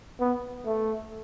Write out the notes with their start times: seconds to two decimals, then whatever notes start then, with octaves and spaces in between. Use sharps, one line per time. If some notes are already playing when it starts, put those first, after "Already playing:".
0.20 B3
0.65 A3